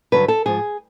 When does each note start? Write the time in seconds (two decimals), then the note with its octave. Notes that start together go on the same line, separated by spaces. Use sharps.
0.12 G2 D3 F#3 B4
0.28 A4
0.46 G#2 F3 G#4